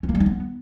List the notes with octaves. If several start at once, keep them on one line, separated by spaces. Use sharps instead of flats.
C#4
A#3
G3
D#4
B3